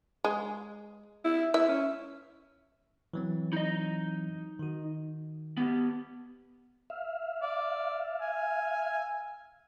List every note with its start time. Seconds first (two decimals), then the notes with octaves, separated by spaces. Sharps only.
0.24 G#3
1.25 E4
1.54 E4 E5
1.68 C#4
3.14 E3 F#3 C4
3.53 D#4 D#5
4.59 D#3 F#4
5.57 B3 G4
6.90 E5 F5
7.42 D5
8.21 G#5